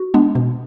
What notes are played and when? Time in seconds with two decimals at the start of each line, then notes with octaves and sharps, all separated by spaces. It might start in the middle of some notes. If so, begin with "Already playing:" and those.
Already playing: F#4
0.14 G#3 B3 D4
0.35 B2